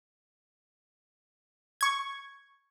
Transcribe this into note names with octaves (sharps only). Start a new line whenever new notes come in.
C#6 G#6